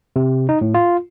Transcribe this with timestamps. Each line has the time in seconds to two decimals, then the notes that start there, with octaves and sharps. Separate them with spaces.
0.16 C3
0.49 D#4
0.61 A2
0.74 F4